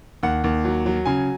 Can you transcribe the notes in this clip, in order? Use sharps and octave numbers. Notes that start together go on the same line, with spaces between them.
D#2 F#5
D#2
F#3
F#3
C#3 G#5